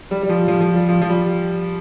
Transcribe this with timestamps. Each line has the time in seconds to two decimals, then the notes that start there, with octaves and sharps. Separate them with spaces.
0.11 G3
0.23 G3
0.29 F3
0.48 F3
0.61 F3
0.75 G3
0.89 F3
1.01 F3
1.09 G3